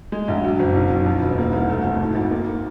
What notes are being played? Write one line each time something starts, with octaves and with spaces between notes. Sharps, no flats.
G#3
A#1
F#3
F#1
B1
B1
F3
E1
A#3
C2
A3
F2
G#1
G#1
A#3